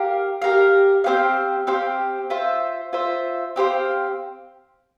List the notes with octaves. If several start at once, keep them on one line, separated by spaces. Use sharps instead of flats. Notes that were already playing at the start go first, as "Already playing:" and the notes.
Already playing: G4 A#4 F5
G4 A#4 F5
C4 G4 C5 F5
C4 G4 C5 F5
F4 C5 E5
F4 C5 E5
C4 G4 C5 F5